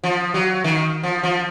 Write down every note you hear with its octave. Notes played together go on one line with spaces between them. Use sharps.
F3
F#3
D#3
F3
F3